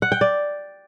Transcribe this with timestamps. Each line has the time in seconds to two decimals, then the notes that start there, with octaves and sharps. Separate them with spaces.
0.02 F#5
0.12 G5
0.21 D5